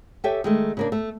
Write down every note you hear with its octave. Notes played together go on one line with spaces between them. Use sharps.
G4 A4 C#5 E5 G5 G#5
D#3 G#3 A3
C#3 A#3 D4
A3